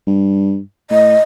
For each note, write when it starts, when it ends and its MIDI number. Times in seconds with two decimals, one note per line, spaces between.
0.07 0.59 43
0.91 1.15 45
0.91 1.21 75